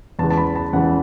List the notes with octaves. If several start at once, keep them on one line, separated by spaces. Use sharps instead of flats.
E2 C#3 E3 G#3 A5
A5
B5
A5
E2 C#3 E3 G#3 F#5